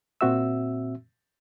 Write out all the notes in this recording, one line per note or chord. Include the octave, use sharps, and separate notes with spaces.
A#2 C4 F#4 E5 E6